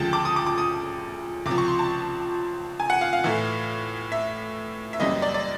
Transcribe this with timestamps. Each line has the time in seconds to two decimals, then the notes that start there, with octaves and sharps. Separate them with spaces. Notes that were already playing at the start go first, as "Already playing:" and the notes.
Already playing: D2 C#3 F3 G#3 G5 A5
0.13 D6
0.25 D#6
0.36 D6
0.46 D6
0.58 D#6
1.46 C#2 C3 F3 D6
1.58 C#6
1.68 C6
1.79 A5
2.80 G#5
2.90 F#5
3.01 F5
3.13 F5
3.24 A2 E3 A3
4.12 E5
4.93 E5
5.00 F#2 C#3 E3 G3 A#3 D#5
5.22 D5
5.34 D5